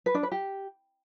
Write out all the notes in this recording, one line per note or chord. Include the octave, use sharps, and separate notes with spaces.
B4
D4
B4
G4